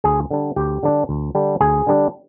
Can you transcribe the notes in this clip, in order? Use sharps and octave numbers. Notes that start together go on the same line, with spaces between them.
D2 G#4 G#5
D3 G3 D4
D2 G4 G5
D3 G3 D4
D2
D3 G3 D4
D2 G#4 G#5
D3 G3 D4